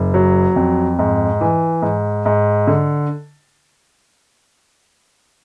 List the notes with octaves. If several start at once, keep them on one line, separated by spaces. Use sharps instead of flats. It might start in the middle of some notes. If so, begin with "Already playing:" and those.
Already playing: F#1
F#3
F2
G#2
E3
G#2
G#2
D3